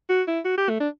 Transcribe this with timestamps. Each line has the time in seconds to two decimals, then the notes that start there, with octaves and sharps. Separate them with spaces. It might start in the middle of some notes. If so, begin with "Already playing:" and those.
0.10 F#4
0.27 E4
0.45 F#4
0.58 G4
0.69 A3
0.80 D4